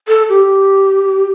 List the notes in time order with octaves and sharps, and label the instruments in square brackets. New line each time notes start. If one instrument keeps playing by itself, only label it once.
[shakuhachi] A4
G4